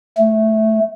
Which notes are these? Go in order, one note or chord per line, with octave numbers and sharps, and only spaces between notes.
A3